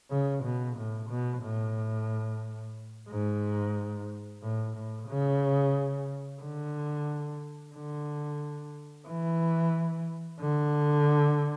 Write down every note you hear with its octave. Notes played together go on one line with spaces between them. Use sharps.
C#3
B2
A2
B2
A2
G#2
A2
A2
C#3
D3
D3
E3
D3